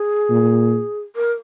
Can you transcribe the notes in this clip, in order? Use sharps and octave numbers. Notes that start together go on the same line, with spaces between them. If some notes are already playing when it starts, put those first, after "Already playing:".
Already playing: G#4
A#2
A#4